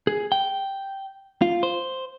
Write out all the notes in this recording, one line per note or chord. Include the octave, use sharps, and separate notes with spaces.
G#4
G5
F4
C5